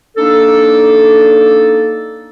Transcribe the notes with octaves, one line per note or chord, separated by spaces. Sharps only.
A#3 D4 D#4 A4